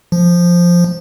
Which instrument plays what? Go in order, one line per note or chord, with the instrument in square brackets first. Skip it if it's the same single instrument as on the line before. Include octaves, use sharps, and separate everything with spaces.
[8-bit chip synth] F3